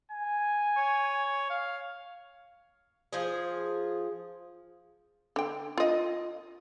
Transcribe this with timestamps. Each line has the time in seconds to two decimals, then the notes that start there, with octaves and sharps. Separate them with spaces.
0.11 G#5
0.76 C#5
1.50 F5
3.13 F3 G#4
5.36 D3 G5
5.77 F4 D#5